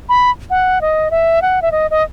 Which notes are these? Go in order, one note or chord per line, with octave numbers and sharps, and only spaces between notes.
B5
F#5
D#5
E5
F#5
E5
D#5
D#5